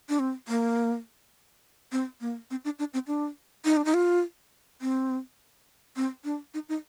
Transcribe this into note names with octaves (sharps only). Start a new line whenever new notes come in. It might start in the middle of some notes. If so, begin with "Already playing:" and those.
D4
C4
A#3
C4
A#3
C4
D4
D4
C4
D4
D#4
D4
D#4
F4
C4
C4
D4
D#4
D#4